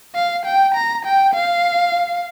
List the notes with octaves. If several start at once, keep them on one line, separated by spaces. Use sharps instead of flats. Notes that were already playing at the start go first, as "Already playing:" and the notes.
F5
G5
A#5
G5
F5